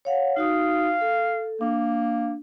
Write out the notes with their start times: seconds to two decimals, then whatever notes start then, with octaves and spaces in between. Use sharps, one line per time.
0.05 C#5 F5 F#5
0.36 D#4 F#4 F5 D#6
1.01 A4
1.61 A#3 D4